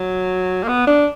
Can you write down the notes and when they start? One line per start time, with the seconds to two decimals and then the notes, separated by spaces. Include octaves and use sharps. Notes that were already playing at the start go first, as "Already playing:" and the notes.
Already playing: F#3
0.63 A#3
0.68 B3
0.87 D4